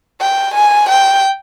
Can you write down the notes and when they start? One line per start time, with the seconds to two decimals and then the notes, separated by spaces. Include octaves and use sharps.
0.21 G5
0.54 G#5
0.89 G5